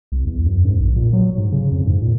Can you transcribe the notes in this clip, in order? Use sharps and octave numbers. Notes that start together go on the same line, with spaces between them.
C2
E2
F#2
G#2
A#1
A#2
F#3
G#2
C#3
F2
G#2
A#2